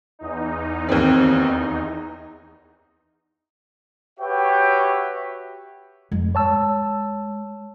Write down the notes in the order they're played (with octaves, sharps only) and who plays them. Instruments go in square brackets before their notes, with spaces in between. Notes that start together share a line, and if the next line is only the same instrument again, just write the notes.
[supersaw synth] E2 D#4
[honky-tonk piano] D#2 C4
[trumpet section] F#4 G4 B4 C#5 E5 G5
[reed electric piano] F2 [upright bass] G#3
[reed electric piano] C#5 A5 E6